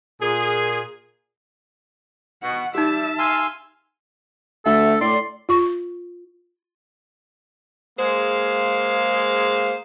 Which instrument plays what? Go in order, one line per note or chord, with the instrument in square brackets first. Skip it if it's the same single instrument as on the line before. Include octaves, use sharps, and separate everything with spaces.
[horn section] A#2 G#4
[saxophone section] B2 [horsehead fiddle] F#5
[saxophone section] G3 [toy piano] D#4 G4 [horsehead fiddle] E5 A5
[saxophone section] F5 [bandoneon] G#5 C6 E6
[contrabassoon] D2 [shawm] A4 [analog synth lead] E5
[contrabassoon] A2 [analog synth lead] D5 [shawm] C6
[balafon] F4 C#6
[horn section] G#3 A#3 G#4 C5 F5